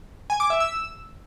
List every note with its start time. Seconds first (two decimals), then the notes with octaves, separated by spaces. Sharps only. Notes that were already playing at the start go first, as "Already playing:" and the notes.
0.30 G#5
0.40 D6
0.50 E5
0.60 E6